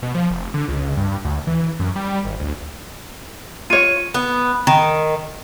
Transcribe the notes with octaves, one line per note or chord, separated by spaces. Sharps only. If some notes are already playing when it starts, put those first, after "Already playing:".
B2
F3
F1
D3
C#2
G2
D2
E3
F#2
G3
G#1
D2
F4 C#5 D#7
B3
D#3